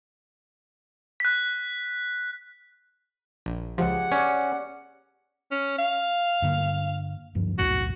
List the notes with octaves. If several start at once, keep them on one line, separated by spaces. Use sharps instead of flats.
F#6 B6
A#1
C#2 F3 G4 G#4 F#5
C#4 D5
C#4
F5
G2 D3 A#3
D1 G2 F3
B1 E2 A2 F#4